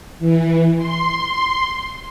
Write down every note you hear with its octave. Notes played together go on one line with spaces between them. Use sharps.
E3
C6